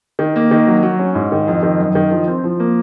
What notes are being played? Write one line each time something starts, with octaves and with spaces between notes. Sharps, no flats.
D#3
A#3
D#3
F#3
F#3
C#4
G#2
D#3
F2
D#3
F#2
D#3
F3
C4
F3
A#3